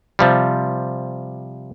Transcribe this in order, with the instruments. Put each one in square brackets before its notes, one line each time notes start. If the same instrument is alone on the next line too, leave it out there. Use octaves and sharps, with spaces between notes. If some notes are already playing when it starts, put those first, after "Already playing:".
[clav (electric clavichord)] C3 F3 G3